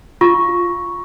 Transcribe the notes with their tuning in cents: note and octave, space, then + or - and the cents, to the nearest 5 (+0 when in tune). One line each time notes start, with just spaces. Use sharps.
F4 +0 C#6 +0